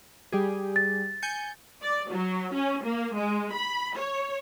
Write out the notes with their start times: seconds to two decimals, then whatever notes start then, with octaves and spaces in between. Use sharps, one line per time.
0.32 G3 G4 G#4
0.76 A6
1.22 G#5 G6 C#7
1.82 D5
2.12 F#3
2.54 C#4
2.84 A#3
3.16 G#3
3.52 B5
3.98 C#5